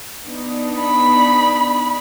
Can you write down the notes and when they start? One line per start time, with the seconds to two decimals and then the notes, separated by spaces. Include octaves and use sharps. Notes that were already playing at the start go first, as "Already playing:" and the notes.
0.24 B3 D4 D#4
0.79 B5